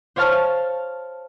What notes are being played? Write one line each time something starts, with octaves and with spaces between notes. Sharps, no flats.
C5 C#5 F5 A5 F6